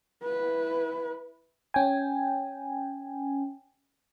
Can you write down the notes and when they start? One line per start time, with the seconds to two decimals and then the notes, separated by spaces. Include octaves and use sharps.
0.24 E4 B4
1.74 C#4 G5 G#5